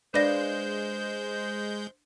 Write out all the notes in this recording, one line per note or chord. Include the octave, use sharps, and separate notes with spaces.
G#3 D4 B4 C5 D5 F5 G6 A#6